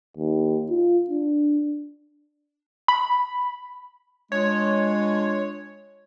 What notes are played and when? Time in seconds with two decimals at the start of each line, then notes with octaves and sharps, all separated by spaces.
0.17 D#2
0.70 F4
1.10 D4
2.88 B5
4.32 G#3 D4 F4 C#5